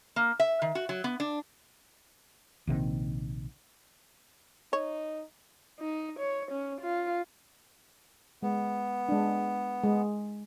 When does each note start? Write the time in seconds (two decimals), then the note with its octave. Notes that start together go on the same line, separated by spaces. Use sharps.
0.16 A#3
0.40 E5
0.62 D#3
0.75 F#4
0.89 F#3
1.04 B3
1.20 D4
2.67 A#1 C3 D#3
4.73 D#4 C#5
5.80 D#4
6.19 C#5
6.52 C#4
6.81 F4
8.43 G#3 B3
9.09 G#3 D4
9.83 G#3